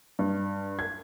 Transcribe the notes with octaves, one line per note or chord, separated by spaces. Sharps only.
G2
G#6